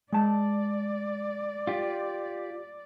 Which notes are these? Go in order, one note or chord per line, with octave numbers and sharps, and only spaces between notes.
G#3 D5 A5
F4 G4